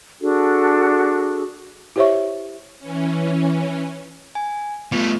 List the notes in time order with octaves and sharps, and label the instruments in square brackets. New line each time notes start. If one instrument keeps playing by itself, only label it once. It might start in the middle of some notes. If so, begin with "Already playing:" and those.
[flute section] D4 F#4 G#4 A4
[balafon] E4 G4 C5 C#5 E5 C#6
[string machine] E3 C#4
[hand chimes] G#5
[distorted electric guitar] G3 A3 [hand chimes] B3 F4